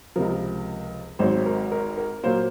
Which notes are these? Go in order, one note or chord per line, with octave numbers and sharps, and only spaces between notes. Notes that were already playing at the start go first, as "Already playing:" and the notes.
C#2 C3 F3 A#4
G#1 G#2 F#3 C4 C5
A#4
A#4
A#4
A#2 F#3 A#3 C5